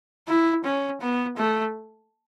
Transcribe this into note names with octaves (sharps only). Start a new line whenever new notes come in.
E4
C#4
B3
A3